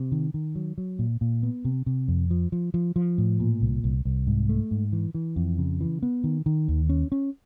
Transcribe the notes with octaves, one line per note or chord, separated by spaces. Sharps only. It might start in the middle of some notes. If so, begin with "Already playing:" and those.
Already playing: C3
D#3
D#3
F#3
F#3
A#2
A#2
B3
C3
C3
F2
F3
F3
F3
F3
A2
A#2
C2
C2
C2
G#2
A3
G#2
E3
E3
F2
C#3
E3
B3
D#3
D#3
D#2
C#4
C#4